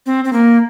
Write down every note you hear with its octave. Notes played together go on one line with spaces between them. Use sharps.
C4
C4
A#3